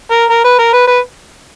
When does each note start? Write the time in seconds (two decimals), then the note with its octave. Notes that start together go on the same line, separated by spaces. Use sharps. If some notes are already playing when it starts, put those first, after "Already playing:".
0.11 A#4
0.30 A#4
0.44 B4
0.59 A#4
0.73 B4
0.87 B4